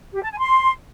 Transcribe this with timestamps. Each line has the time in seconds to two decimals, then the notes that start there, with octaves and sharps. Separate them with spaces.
0.14 G4
0.23 A5
0.31 G#5
0.39 C6